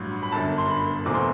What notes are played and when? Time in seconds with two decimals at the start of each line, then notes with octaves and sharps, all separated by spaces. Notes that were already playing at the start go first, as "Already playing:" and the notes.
Already playing: A1 G2 F#3
0.23 B5
0.32 G1 F#2 D3 A5
0.58 C6
0.70 B5
1.05 E1 E2 B2 A3 C4 D6
1.14 C6